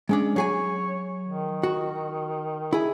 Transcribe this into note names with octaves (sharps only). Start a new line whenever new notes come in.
G#3 C#4 D4
F#3 G#4 C#5 G#5
D#3
F#4
E4 G#4